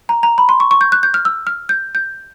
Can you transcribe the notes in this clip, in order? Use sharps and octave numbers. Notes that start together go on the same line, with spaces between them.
A#5
A#5
B5
C6
C#6
C#6
G6
F#6
G6
F6
E6
F6
G6
G6